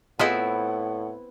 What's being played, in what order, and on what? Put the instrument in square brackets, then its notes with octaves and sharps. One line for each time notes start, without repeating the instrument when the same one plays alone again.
[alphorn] A2 [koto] B3 C4 E4 [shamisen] F4 G#4 D#5 [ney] F#5